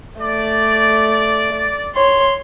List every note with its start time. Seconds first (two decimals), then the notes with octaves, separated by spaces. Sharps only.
0.22 A3 D5
1.96 C#5 C6